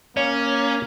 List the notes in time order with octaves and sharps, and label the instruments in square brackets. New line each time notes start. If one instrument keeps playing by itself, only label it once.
[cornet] A#3 [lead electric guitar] C#4 [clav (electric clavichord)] C#5